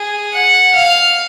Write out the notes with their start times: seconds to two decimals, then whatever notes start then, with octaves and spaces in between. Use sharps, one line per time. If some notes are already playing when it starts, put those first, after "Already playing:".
Already playing: G#4
0.33 F#5
0.75 F5